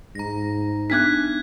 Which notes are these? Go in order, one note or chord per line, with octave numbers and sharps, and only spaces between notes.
G#2 A#5 A#6
B3 D4 D#4 F#6 G#6 B6